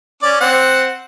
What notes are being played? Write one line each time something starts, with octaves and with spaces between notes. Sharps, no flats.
C#4 D5
C4 F#5